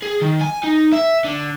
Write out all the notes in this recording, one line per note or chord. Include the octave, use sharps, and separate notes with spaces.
G#4
D#3
G#5
D#4
E5
D3